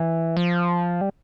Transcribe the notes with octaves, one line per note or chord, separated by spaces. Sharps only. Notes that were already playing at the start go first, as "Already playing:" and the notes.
Already playing: E3
F3
G3